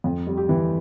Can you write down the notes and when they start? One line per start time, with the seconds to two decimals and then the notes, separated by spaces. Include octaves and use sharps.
0.04 F2
0.27 G3
0.37 G4
0.49 E3